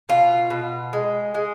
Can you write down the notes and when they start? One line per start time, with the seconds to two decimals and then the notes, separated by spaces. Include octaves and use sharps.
0.09 B2 F4
0.50 B2
0.93 G#3
1.34 G#3